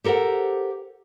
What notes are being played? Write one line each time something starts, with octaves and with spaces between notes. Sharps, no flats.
G4 A4 A#4 C5 F#5